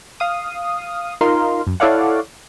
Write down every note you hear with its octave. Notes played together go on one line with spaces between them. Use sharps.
F5 D#6
D#4 F4 A#4 F5 C6
F#2
E4 A4 C#5 D5 F5 F#5